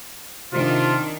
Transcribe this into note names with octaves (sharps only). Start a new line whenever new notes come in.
C3 D#3 D4 F4